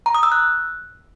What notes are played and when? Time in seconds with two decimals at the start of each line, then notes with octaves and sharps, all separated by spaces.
0.06 A#5
0.15 D#6
0.23 E6
0.32 F#6